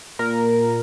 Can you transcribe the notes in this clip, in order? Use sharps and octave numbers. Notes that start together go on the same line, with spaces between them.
A#2 A#4